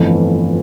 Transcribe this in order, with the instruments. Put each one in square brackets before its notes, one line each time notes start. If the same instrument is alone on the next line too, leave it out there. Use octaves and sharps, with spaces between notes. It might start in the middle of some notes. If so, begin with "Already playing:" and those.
Already playing: [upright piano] G1 F2 E3 A3